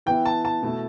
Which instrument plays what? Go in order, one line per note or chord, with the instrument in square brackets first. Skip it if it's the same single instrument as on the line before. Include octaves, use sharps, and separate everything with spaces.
[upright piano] E3 B3 E4 [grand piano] G5
[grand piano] A5
A5
[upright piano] B2 A3 E4